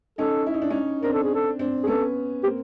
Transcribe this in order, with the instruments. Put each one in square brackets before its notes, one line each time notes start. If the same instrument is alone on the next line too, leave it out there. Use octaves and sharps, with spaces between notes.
[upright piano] C#4 D#4 [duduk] A4
[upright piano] E4
D#4
D4
C#4 D#4
[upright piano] C4 D4 [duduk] A#4
[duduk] A4
G#4
A4
[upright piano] C4 D4
[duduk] G#4
[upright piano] B3 C#4 [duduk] A4
[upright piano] A#3 C4 [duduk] G4